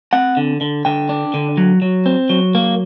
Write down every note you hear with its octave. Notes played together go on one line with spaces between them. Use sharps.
C4 F#5
D3
D3
D3 G5
D4
D3
F#3
F#3
C4
F#3
A#3